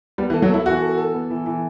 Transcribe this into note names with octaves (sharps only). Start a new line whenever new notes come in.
G3 B3
E3
A4
F#3
E4 A4
E3 F#4
A4
A4
B3
E3
E3